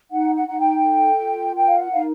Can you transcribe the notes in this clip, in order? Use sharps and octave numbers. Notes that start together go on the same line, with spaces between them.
D#4 F#5
F#5
D#4 F#5
G5
A4
F4
A#4 G5
F5
F#5
D#4 F5